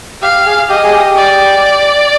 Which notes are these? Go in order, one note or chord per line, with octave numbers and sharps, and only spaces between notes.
G4 F5
G#4
G4 D#5
G#4
G4
D5